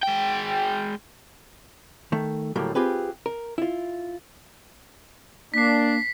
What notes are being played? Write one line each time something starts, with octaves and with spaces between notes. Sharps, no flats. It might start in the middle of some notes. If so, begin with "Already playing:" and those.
G#3 G5
D#3 A3
A2 D3 F#3 G3 A#3
C4 F4 G4 G#4 B4
A#4
E4 F4
A#3 D4 B6 C7